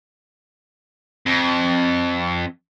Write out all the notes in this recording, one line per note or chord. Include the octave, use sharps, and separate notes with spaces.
F2